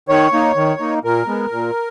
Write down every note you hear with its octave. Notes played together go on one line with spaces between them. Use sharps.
D#3 C#5
A#3 D#4
D#3
A#3 D#4
A#2 A#4
G#3 B3
A#2